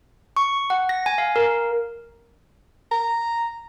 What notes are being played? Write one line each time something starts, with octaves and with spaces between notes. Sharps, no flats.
C#6
F#5
A#6
G#5
F5
A#4
A#5